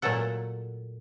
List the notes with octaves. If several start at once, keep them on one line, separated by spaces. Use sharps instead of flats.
A#2 F#3 A3 A4 F#5